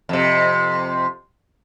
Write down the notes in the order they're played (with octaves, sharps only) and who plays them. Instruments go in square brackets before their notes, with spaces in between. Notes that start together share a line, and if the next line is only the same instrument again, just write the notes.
[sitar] F2 C3